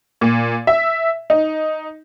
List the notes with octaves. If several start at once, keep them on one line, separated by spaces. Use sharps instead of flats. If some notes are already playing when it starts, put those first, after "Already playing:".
A#2
E5
D#4